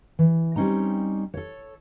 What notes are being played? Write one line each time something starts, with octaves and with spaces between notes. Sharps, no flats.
E3
G3 C4 C#4 D#4 A#5
A4 C#5